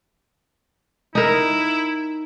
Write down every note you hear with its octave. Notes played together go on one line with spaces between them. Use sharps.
D#4 E4 A#4